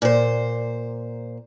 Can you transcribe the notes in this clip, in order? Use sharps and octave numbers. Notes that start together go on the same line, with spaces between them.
A#2 C5